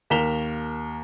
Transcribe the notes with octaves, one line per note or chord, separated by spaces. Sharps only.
D#2 A#4 B6 E7 F7 G7